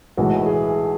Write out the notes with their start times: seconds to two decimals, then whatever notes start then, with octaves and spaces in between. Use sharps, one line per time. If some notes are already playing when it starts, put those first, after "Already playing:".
0.17 B1 A2 E3 G#3 F#4
0.46 G#4